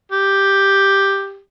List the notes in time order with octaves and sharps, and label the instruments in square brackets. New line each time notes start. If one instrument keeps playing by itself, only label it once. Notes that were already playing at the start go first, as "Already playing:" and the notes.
[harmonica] G4